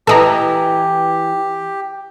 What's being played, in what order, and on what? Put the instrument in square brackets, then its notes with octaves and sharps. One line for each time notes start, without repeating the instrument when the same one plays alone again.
[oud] E3 E4 [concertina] G4 [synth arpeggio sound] A4 D#5 A#5